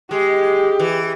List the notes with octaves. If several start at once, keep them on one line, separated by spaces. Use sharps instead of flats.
G#3 G4
E3